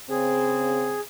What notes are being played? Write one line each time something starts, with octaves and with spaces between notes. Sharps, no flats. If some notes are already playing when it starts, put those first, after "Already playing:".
C#3 C4 G#4